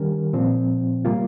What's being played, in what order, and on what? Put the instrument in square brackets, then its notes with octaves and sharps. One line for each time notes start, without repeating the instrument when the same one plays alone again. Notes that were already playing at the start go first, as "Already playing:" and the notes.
Already playing: [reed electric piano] D#3 G3 C#4 G4 A#4
A#2 F3 C4
C#3 G3 A#3 F4